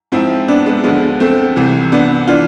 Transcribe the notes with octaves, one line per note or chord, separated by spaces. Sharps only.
G#2 F3 C4 E4
B3 D4
G#3 B3
D2 D3 F3 G#3 B3
A3 C4
C2 C3 E3
B3 D4
E3 D4 F4